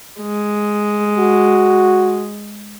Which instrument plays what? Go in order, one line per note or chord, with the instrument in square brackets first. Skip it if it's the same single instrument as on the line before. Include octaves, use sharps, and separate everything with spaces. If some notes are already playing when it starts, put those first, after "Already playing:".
[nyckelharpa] G#3
[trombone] F#4